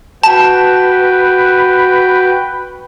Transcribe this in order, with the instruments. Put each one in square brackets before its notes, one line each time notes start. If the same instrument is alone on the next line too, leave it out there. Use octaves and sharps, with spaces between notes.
[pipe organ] F#4 G5 [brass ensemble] B4 [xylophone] A5